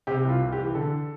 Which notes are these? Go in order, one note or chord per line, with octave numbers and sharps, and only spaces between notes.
C3 G4
C2
F4
C2
G4
E3
D3 A4